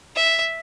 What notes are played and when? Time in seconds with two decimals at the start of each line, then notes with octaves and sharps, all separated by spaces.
0.16 E5